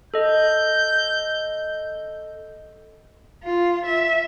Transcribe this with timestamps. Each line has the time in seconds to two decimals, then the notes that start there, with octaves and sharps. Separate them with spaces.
0.14 A4 D#5 G6
3.44 F4
3.87 E5